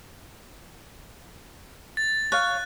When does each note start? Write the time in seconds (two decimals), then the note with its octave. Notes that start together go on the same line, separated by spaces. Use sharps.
1.97 A6
2.32 C#5 F5 F#6